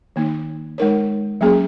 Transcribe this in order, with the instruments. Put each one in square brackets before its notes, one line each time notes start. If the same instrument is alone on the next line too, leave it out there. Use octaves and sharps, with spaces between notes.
[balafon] D#3 A#3 D#4
G#3 D#4 A#4 C#5
F#3 A#3 C#4 G#4